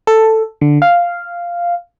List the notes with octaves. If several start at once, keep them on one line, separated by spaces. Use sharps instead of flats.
A4
D3
F5